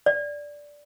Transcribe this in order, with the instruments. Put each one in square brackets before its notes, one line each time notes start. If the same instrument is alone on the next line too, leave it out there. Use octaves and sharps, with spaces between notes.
[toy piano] D5